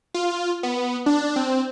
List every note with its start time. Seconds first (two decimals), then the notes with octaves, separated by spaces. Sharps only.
0.14 F4
0.63 B3
1.06 D4
1.36 C4